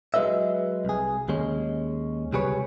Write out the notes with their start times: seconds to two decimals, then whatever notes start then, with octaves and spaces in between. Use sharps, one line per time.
0.14 F#3 G#3 F4 B4 D#5 E5
0.85 C2 G#4
1.28 D#2 G#3 C#4
2.33 C#2 C3 G3 G#4 B4 C#5